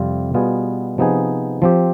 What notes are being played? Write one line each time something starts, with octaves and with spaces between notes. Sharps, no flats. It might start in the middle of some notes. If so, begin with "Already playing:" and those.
Already playing: F2 C3 G3 C4 F4
B2 G3 B3 F4 G#4
C3 F3 B3 D#4 G#4
F3 C4 G4